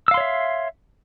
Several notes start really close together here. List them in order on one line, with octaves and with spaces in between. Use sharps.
E6 F5 C6 C#5 E5